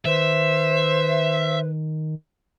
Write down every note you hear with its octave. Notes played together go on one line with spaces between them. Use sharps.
D#3 B4 C5 E5